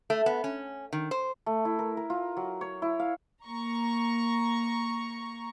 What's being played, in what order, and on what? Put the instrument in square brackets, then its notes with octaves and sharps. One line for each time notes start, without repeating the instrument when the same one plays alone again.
[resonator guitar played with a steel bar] A3
B3
C#4
D#3
C5
[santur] A3
E4
A#4
A#4
F4
F#3
C#5
E4
F5
[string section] A#3 A#5 C#6